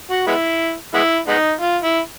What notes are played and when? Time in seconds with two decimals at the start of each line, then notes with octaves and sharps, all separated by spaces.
0.10 F#4
0.27 G#3 B3 E4
0.94 G#3 B3 E4
1.28 G#3 B3 D#4
1.61 F4
1.83 E4